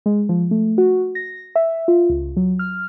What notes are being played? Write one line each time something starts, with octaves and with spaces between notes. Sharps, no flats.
G#3
F3
A3
F#4
A#6
E5
F4
C#2
F#3
F6